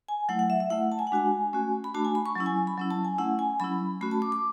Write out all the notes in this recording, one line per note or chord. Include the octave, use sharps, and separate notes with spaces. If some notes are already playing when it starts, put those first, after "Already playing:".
G#5
F#3 A3 E4 F#5
F#5
E5
E5
A3 E4 F#5
A5
G#5
F#5
G#3 D4 F#4 G#5
A3 C#4 F#4
B5
A3 D4 F#4 A5
G#5
B5
C#6
F#3 C#4 E4
G#5
B5
F#3 C#4 E4
A5
G#5
A3 C#4 E4 F#5
G#5
F#3 C#4 E4 B5
A3 C#4 F#4 B5
A5
D6
D6